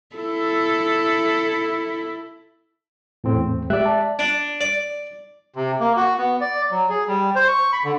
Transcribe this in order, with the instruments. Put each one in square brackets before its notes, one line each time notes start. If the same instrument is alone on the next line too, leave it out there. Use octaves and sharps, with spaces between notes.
[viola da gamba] E4 A4
[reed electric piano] E2 A2 C4
[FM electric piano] G#3 G4 F#6 [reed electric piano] D5 E5
[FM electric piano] A5
[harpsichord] D4
D5
[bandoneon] C3
A#3
F#4
B3
D5
F#3
G#4
G3
C5
C#6
B5
D3